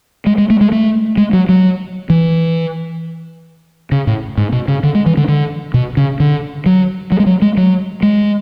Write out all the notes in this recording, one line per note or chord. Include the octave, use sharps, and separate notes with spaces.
G#3
G#3
A3
G#3
A3
G#3
F#3
F#3
E3
C#3
A2
G#2
B2
C#3
D3
G#3
E3
D3
D3
B2
C#3
D3
F#3
F#3
G#3
F#3
G#3
F#3
G#3